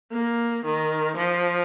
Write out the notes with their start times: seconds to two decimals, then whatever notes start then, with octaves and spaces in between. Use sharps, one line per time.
0.12 A#3
0.65 D#3
1.16 F3